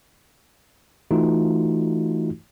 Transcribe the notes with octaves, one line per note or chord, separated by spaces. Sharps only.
E3 A3 D#4 F4 F#4